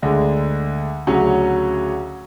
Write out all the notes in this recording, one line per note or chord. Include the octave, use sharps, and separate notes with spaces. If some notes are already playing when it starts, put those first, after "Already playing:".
D2 D3 G#3
D2 C#3 F#3 C#4